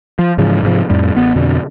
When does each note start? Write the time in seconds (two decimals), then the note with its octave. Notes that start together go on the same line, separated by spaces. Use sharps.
0.19 F3
0.38 G#2 C#3 E3 F3
0.63 G#2 C3 F3
0.89 F2 A2 G3
1.15 A1 B3
1.36 F2 B2 D3